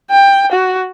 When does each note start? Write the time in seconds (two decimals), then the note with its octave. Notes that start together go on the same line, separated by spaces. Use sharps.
0.11 G5
0.52 F#4